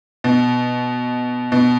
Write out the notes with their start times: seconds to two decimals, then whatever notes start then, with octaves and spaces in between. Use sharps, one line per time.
0.24 B2
1.52 B2